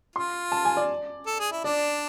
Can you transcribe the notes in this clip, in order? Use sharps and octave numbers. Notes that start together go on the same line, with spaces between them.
F4 C6
A5
G#5
D5
A4
G#4
E4
D4 D5